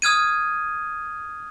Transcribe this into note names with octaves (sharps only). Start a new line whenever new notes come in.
D#6 F6 G#6 D#7